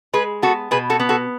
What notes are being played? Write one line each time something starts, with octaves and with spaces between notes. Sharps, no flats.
G#3 G#4 B4
B3 F#4 A4
B2 G#4 B4
F#4 A4
B3
F#4 A4